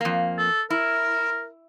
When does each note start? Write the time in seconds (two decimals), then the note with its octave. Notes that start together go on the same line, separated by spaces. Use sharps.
0.01 F2 A#3
0.38 A4
0.70 E4 A#4